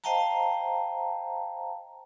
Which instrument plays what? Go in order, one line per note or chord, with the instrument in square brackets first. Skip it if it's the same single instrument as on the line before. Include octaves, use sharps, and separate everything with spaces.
[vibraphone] C5 D#5 F5 G5 A5 A#5